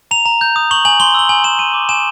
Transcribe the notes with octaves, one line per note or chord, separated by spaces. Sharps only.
A#5 F7
A#5
G6
D#6
C#6 F#7
G#5 F#7
C6 G7
E6 G7
G#5 F#7
G#5 E7
A#5 D#7
D6
G#5 E7